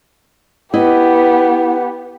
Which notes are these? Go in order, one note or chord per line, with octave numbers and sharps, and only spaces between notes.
B3 E4 G4 D#5